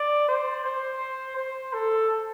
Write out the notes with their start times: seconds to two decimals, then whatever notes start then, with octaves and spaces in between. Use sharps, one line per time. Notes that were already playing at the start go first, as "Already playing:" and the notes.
Already playing: D5
0.28 C5
0.65 C5
1.37 C5
1.73 A4